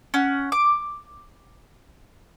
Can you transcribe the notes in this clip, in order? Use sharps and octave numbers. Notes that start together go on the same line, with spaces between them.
C#4 F#5
D6